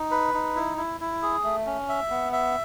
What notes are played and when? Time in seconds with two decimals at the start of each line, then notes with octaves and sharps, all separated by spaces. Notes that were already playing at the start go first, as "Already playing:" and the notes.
Already playing: D#4
0.11 B4
0.34 D#4
0.56 E4
0.77 E4
1.00 E4
1.22 G#4
1.44 A3
1.66 C#4
1.89 E5
2.10 B3
2.33 E5